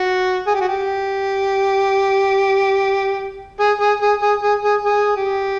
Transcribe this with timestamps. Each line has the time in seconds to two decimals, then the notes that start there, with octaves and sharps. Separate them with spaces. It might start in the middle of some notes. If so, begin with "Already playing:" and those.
Already playing: F#4
0.47 G#4
0.54 G4
0.61 F#4
0.69 G4
3.60 G#4
3.81 G#4
4.01 G#4
4.22 G#4
4.43 G#4
4.64 G#4
4.85 G#4
5.16 G4